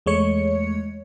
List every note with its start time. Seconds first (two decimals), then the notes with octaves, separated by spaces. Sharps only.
0.06 E2 G#3 A3 C#5 C#7